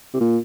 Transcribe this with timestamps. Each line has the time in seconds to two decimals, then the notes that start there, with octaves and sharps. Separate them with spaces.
0.14 C3
0.21 A#2